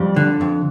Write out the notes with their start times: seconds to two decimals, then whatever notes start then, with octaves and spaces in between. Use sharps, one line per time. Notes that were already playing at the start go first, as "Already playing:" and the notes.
Already playing: F2 G3
0.16 D3
0.41 F2